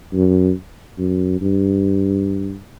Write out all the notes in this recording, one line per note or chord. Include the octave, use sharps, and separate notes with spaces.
F#2
F#2
G2